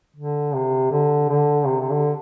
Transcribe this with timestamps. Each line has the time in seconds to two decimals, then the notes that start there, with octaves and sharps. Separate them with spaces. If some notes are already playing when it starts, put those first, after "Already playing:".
0.16 D3
0.54 C3
0.91 D3
1.29 D3
1.66 C3
1.80 C3
1.90 D3